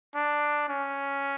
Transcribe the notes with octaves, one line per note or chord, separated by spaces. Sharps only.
D4
C#4